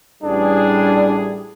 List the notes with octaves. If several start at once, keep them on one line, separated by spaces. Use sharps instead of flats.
A1 G3 D4 G#4